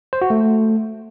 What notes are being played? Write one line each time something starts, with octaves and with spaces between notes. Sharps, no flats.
C5
F#4
A3